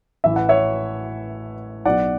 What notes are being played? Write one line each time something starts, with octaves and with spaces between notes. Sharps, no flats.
A1 A2 E3 E5
F#5
C#5 E5
B1 B2 D5 F#5